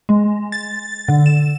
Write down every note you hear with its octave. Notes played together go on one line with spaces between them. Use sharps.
G#3
A6
D3
E7